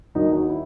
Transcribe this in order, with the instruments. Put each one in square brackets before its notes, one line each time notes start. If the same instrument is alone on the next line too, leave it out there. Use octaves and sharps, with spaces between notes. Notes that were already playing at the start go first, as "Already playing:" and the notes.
[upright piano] D#2 D#3 D#4 F#4
D#4 F#4
E4